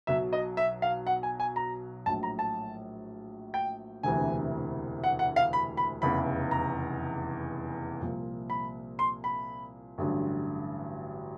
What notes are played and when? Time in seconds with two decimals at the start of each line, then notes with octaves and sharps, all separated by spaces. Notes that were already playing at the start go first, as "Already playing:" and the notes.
0.07 B1 B2 F#3 E5
0.33 D#5
0.57 E5
0.82 F5
1.07 F#5
1.23 G#5
1.40 G#5
1.56 A#5
2.06 A#1 A2 F#3 A5
2.23 A#5
2.39 A5
3.54 G5
4.03 E1 D2 C3 E3 G#5
5.04 F#5
5.19 F#5
5.36 F5
5.53 B5
5.77 B5
6.02 F1 E2 C#3 E3 B5
6.51 A#5
8.01 C2 A#2 F3
8.50 B5
8.99 C6
9.24 B5
9.98 A1 G2 D3 F#3